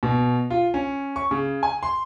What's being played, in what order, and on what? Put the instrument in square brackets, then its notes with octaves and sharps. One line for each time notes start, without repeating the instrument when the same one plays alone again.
[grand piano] B2
F4
C#4
C#6
C#3
G#5
C6